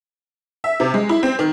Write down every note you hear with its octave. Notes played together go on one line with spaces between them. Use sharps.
E5
C3
G#3
E4
C4
D#3